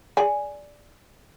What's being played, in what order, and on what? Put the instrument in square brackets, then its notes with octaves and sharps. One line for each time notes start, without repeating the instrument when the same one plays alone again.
[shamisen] G#4 D5 G#5